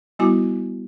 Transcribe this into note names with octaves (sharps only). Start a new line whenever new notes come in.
G3 B3 E4 F#4 G#5 D6